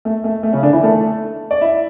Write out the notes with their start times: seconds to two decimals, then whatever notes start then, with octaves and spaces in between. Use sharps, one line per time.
0.05 A3
0.24 A3
0.43 A3
0.53 C#3 C#4
0.63 D3 D4
0.73 E3 E4
0.83 A3 A4
1.51 D5
1.61 E4 E5